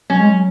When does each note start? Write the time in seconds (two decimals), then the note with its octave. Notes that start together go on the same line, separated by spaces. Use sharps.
0.10 F#3 C#4
0.19 G#3
0.29 F#3